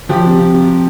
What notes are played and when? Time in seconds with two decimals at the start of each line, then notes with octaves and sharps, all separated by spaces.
0.09 F3 G4
0.24 C3
0.39 C3
0.53 C3